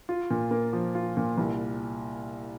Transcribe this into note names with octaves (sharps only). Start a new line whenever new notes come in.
F4
A#2
A#3
F3
F4
A#2
C2